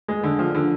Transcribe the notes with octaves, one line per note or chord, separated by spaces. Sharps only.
G#3
D3
F3
D3